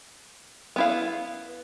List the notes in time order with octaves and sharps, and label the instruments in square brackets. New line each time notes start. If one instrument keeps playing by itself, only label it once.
[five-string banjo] B3 E4 F5